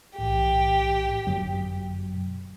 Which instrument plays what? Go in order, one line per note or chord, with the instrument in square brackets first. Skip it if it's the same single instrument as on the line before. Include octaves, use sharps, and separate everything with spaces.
[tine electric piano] B1 A2 E3 [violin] G4
[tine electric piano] G#1 F#2 D3 F#3